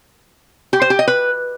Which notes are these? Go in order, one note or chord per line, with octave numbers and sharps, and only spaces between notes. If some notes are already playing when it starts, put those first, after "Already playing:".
G4
C5
G4
D#5
B4